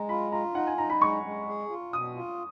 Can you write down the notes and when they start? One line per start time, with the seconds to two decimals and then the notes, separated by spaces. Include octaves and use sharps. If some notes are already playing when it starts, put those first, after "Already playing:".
Already playing: G#3 A#5
0.09 F4 B5
0.32 F4 A#5
0.55 D#4 F#5
0.67 G#5
0.78 D#4 A#5
0.90 B5
1.01 G#3 C#6
1.24 G#3
1.47 G#4
1.70 F4
1.93 B2 D#6
2.16 F4